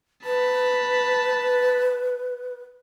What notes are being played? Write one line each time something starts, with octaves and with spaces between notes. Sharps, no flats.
B4 A5 B5